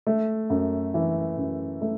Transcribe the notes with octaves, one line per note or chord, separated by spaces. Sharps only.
A3
F#2
E3
F#2
A3